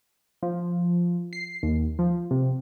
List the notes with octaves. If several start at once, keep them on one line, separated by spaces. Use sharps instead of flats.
F3
C7
D#2
F3
C3